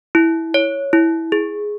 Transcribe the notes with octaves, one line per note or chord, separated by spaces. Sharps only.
E4
C#5
E4
G#4